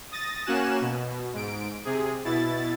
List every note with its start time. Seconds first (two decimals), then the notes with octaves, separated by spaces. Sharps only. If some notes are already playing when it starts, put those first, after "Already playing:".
0.11 D#6 A6 A#6
0.46 A#3 C#4 F#4 G#5 F#6 E7
0.81 B2
1.34 G#2 D7
1.85 C3 G#4
2.25 B2 E4 A6